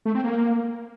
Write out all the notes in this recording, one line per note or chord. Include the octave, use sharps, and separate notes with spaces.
A3
C4
A#3